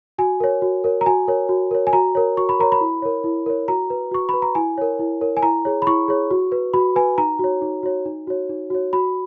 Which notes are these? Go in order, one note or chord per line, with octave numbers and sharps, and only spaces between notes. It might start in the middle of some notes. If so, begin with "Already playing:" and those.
F#4 G#5
A#4 C#5
F#4
A#4 C#5
A#5
F#4 G#5
A#4 C#5
F#4
A#4 C#5
G#5
F#4 A#5
A#4 C#5
F#4 C#6
B5
A#4 C#5 A#5
B5
E4
A#4 C#5
E4
A#4 C#5
F#4 A#5
B4
F#4 C#6
B4 B5
A#5
E4 G#5
A#4 C#5
E4
A#4 C#5
G#5
E4 A#5
G#4 C#5
B5
E4 C#6
G#4 C#5
F#4
B4
F#4 B5
B4 G#5
D#4 A#5
F#4 C#5
D#4
F#4 C#5
D#4
F#4 C#5
D#4
F#4 C#5
F#4 B5